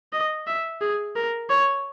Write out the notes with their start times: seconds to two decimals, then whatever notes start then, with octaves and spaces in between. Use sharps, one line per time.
0.13 D#5
0.47 E5
0.81 G#4
1.16 A#4
1.49 C#5